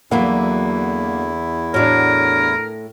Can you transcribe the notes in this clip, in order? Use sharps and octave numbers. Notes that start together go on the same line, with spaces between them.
E2 D3 E3 F#3 A#3 E4 F#5
A2 D4 F#4 A#4 C#5 D5